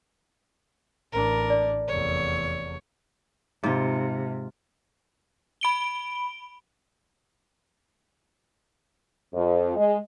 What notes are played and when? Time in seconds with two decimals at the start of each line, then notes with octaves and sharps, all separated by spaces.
1.13 A1 D4 A#4
1.50 D5
1.88 F1 E2 C#5
3.63 G#2 C3 F4
5.61 B5 D7 G7
9.34 F2
9.76 G#3